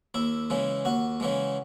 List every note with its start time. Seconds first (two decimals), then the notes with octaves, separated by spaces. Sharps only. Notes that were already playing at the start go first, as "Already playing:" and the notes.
0.14 D#2 E4
0.50 C#3 E3 G#3
0.85 D#2 F#4
1.20 C#3 E3 G#3